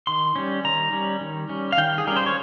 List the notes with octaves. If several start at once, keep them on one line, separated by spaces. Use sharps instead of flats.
D#3 C6
G3 C#4
D#3 A#5
G3 C#4
D#3
G3 C#4
F5
D#3 G5
G#4
G3 C#4 A#4
C5
C#5